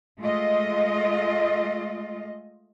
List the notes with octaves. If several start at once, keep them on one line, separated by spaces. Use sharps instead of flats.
G#3 A3 F4 D#5